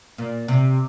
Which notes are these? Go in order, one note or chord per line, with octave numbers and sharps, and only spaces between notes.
A#2
C3